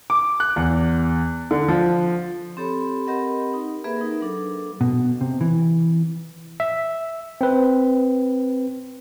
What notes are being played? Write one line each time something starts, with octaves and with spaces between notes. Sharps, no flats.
D6
F#6
E2
D3
F3
C4 G4 A4 C#5 B5
C4 G4 A#4 D#5 F#5 B5
D#4
A#3 G#4 B4 E5 B5
D#4 A#4
F#3 D4 A4
B2
C3
E3
E5
C4 B4